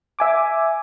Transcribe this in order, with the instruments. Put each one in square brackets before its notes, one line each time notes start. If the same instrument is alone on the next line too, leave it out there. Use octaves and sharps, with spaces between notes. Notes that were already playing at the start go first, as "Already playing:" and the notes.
[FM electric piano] E5 G#5 D6